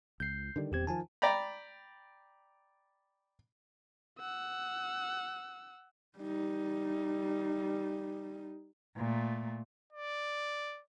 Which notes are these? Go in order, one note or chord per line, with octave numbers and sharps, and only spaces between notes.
C#2 G6 C7
D3 D#3 G3
D#1 E2 C4 G4 G#6
D#3 F3 G#5 A5
D5 G5 A#5 B5
F#5 E6
G3 D#4
A#2 A3
D5